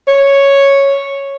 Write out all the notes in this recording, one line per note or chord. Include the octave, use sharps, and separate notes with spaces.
C#5